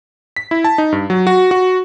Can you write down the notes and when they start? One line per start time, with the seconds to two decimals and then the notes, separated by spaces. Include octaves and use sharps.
0.37 B6
0.51 E4
0.64 A5
0.78 D#4
0.92 G2
1.10 F#3
1.27 F#4
1.51 F#4